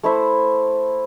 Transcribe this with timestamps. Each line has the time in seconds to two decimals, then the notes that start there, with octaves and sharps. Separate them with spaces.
0.03 A3 E4 C5 E5